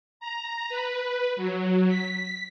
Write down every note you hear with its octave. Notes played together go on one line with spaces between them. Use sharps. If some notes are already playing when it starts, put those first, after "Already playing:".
A#5
B4
F#3
B6